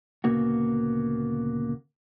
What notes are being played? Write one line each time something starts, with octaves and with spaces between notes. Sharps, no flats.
D2 A#2 C#3 A#3 B3 F#4